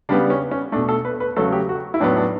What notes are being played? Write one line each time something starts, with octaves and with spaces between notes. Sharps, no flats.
C#3 G3 B3 D4
C#4
C#4
B2 A3 D4
A4
B4
B4
C#3 F#3 A3 A4
G4
F#4
E4
A2 F#3 B3 D4
D4